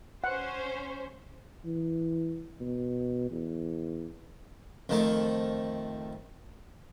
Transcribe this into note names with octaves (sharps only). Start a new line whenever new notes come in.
C#4 C5 F#5
E3
B2
E2
F2 D#3 A3